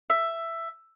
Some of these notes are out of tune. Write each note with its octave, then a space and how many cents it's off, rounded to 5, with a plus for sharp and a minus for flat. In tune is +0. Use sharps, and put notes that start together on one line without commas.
E5 +10